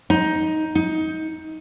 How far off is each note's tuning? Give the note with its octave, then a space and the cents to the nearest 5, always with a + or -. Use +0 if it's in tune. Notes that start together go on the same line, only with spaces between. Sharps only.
D#4 +10
D#4 +20